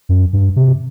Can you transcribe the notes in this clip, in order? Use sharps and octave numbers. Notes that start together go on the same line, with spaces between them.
F#2
G2
C3